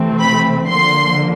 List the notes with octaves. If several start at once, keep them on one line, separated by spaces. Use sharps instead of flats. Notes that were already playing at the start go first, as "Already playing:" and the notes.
Already playing: C3 E3 A3 C4
B5
D3 F3 A#3 C6